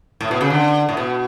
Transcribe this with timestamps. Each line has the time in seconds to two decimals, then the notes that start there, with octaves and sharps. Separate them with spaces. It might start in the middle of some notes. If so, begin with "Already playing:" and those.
0.21 A2
0.31 B2
0.41 C#3
0.50 D3
0.89 A2
0.97 B2